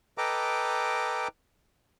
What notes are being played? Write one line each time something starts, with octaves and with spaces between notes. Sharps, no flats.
A4 B4 D#5 G5 A#5 D6